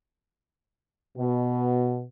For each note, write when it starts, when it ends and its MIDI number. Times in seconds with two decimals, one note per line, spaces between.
1.17 2.03 47